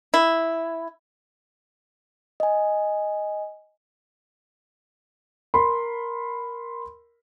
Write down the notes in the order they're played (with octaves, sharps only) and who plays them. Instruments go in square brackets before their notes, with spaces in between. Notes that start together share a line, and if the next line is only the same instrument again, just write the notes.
[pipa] E4
[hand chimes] D#5 G#5
[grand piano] A#4 B5 C6